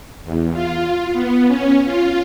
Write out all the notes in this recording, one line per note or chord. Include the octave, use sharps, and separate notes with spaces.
E2
F4
B3
C#4
F4